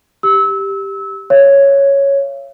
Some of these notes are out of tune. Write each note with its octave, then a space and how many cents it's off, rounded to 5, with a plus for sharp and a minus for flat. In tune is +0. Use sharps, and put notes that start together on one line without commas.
G4 +0 E6 -25
C#5 +0 F5 -40